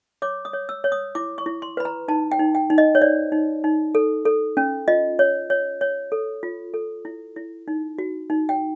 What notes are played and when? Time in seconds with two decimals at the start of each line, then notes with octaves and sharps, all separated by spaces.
0.22 C#5 D6
0.45 D#6
0.53 C#5
0.69 E6
0.84 C#5
0.92 D#6
1.15 E4 D6
1.38 C#6
1.46 E4
1.62 C6
1.77 B4 B5
1.85 A#5
2.08 D#4 A5
2.32 G5
2.39 D#4
2.55 G5
2.70 D#4
2.78 D#5
2.95 C#5
3.01 C5 D5
3.32 D#4
3.64 D#4
3.95 A4
4.25 A4
4.57 C#4
4.88 F4 D#5
5.19 C#5
5.50 C#5
5.81 C#5
6.12 A4
6.43 F4
6.74 A4
7.05 E4
7.36 E4
7.68 D#4
7.98 F#4
8.30 D#4
8.49 G5